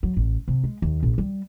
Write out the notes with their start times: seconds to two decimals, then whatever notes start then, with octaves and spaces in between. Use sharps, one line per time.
0.03 F#3
0.17 A1
0.48 C3
0.64 G#3
0.82 D#2
1.03 A#1
1.18 G3